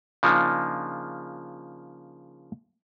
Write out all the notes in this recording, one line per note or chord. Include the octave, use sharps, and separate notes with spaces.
C#3 F3 A#3 D4 D#4